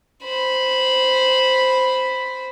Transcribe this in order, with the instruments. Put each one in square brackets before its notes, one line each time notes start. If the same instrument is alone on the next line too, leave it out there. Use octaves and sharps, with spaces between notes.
[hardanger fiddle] C5 B5